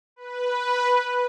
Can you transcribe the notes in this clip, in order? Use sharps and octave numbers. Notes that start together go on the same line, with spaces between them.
B4